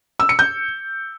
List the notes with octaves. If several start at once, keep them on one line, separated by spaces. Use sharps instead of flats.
E6
C#7
G6